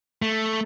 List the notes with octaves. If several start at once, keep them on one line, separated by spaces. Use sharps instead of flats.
A3